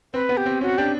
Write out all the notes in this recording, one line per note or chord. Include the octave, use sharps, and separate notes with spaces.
C4 B4
B3
G4
C4
C#4 F#4
D4 G4